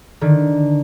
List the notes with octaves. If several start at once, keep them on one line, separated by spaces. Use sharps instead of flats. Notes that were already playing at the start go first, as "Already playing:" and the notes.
D3 D#3